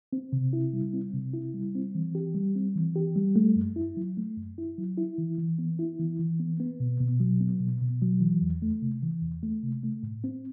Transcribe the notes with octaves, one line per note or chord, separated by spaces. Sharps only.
C4
C3
E4
G3
C4
C3
E4
G3
C4
E3
G4
G3
C4
E3
G4
G3
A3
F#2
E4
F#3
A3
F#2
E4
F#3
E4
E3
E3
B3
E4
E3
E3
B3
B3
B2
B2
F#3
B3
B2
B2
F#3
E3
E2
A3
C3
E3
E2
A3
C3
A3
A2
C4